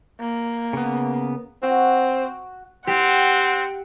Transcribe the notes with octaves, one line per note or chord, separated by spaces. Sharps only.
A#3
C#3 B3
C4 F#4
C4 G4 F#5